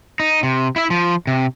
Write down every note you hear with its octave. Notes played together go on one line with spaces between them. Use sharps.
D#4
C3
E4 E5
F3
C3